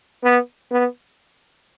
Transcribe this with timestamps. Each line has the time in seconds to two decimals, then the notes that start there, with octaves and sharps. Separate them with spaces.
0.23 B3
0.71 B3